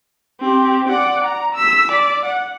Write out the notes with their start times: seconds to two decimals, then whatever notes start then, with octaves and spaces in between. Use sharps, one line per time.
0.40 C4 G4
0.89 D5 F#5
1.25 A#5
1.55 E6 B6
1.92 D5
2.26 F#5